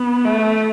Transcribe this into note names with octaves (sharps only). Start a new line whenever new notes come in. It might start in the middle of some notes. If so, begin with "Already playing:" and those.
Already playing: B3
A3